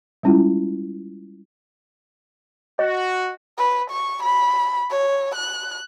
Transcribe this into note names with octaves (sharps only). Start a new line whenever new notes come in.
G3 G#3 C#4 E4 F4
F#4 D#5
B4
C#6
B5
C#5
F#6